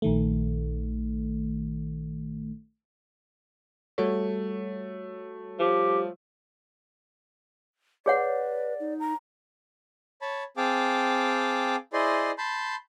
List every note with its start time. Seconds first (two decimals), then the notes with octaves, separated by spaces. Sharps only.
0.02 A#1 D#3 A3
3.98 G3 A3 F#4 C#5
5.59 F3 G4
8.06 G#4 B4 C#5 D5 F#5
8.80 D#4
9.00 A#5
10.22 C#5 A5 B5
10.57 C4 G#4 F5 G5 A5 D6
11.93 E4 G#4 C5 D5 D#5 C6
12.38 A5 B5 C6 G6